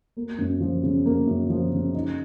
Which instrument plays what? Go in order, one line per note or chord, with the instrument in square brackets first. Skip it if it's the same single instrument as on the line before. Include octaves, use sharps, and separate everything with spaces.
[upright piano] A#3
F#2
F3
C#3
A#3
F#2
F3
C#3
D#4